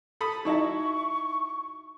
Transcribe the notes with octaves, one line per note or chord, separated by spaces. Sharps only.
A4 B5 D#6
F#3 D#4 E4 D#5 E5 C#6